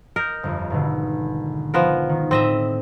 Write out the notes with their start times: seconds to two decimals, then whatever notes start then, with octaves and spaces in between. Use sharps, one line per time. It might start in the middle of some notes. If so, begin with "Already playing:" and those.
0.16 A#4 D#5 G6
0.43 G1 F2
0.70 G#1 B2 D3
1.74 F3 B3 A#4
2.09 D#3
2.31 A2 C4 D#5 E5